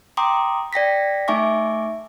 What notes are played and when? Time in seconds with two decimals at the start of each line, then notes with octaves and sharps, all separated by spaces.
0.17 G5 A#5 C6 D6 D#6
0.73 D5 G5 A#6 B6
1.28 A3 D#4 E5 G#5 C#6 D6